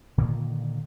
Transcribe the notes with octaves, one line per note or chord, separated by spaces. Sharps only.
A#2 D3 D#3 A#3